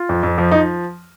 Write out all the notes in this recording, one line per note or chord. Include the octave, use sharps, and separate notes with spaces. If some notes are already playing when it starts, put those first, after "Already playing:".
Already playing: F4
F2
F2
F3
F3 D#4